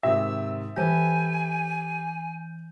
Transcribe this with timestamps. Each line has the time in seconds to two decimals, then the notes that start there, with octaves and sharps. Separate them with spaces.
0.03 G#2 C3 D#3 E5 E6
0.76 E3 G4 A4 B4 G#5 G6